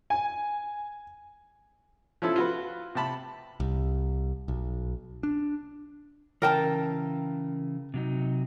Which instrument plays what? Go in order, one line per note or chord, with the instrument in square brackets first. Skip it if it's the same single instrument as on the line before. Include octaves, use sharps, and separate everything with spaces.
[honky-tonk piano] G#5
[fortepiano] F3 C#4 E4 A4
F4 F#4 B4
C3 G4 A5 B5
[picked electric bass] C2
B1
D4
[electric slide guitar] C#3 E3 [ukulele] A#4 G5 A5
[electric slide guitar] C3 F#3 D#4